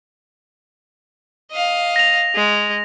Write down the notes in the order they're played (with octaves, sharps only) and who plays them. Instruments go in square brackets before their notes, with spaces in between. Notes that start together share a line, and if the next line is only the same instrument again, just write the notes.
[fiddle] D#5 F5
[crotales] A#6 F7
[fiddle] G#3